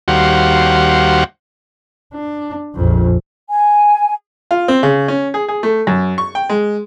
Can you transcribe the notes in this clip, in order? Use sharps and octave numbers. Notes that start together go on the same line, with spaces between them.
D#2 G3 F#4 C5 F5 F#5
D4
A#1 F2
G#5
F4
C4
C#3
C#4
G#4
G#4
A3
F#2
C#6
G5
G#3